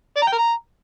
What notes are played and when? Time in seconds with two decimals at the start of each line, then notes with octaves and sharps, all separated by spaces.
0.17 D5
0.22 A#5
0.27 G5
0.32 A#4
0.38 A#5